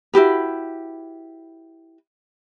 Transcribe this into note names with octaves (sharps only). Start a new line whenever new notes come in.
E4 F#4 G4 B4